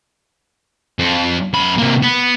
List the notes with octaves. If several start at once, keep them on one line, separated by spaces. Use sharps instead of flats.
F2
F#2 B5
C3 A#3
B3